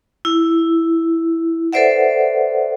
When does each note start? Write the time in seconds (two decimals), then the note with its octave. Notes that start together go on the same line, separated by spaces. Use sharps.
0.25 E4
1.73 A4 B4 C5 D5 E5 F#5